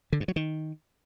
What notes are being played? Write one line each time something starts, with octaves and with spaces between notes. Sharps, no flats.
D3
G2
F#3
D#3